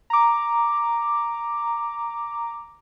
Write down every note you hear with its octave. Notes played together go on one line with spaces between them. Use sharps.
A#5 D6